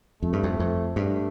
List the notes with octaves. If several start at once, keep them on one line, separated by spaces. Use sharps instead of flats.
F2 A3
G2
F2
F2
G2 A3